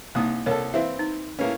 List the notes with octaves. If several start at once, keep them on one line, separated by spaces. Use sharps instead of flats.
C2 A#3 D#4 D#6
C2 A4 A#4 C#5
E3 C4 E5 F5
D#4
A2 A#3 C#4 B4